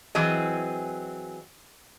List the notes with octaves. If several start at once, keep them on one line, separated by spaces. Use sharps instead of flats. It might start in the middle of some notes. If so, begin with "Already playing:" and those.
E3 F#3 C4 G#4 D#5